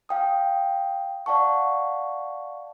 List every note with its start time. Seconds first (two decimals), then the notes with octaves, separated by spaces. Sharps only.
0.09 F5 G5 D#6
1.26 D5 F5 F#5 A5 C#6